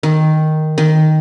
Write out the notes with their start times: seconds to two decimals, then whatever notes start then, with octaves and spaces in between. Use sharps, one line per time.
0.03 D#3
0.78 D#3